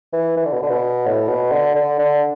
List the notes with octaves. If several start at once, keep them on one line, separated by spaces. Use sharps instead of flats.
E3
E3
D3
B2
D3
B2
A2
B2
D3
D3
D3